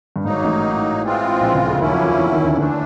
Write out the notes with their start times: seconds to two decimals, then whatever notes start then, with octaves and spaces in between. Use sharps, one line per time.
0.16 G2
0.25 G#1 G#2 F#3 A#3 D#4
0.44 A1 A2
1.02 E3 G#3 C4 F4
1.41 A#1 A#2
1.54 C#2 C#3
1.67 D2 D3
1.80 D#2 D#3 F#3 A#3 C#4 E4
1.93 F2 F3
2.05 F2 F3
2.19 E2 E3
2.31 D#2 D#3
2.44 D2 D3
2.57 D2 D3 E3 A3 D4